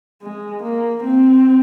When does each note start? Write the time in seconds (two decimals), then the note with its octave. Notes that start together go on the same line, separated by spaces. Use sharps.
0.22 G#3
0.63 A#3
1.04 C4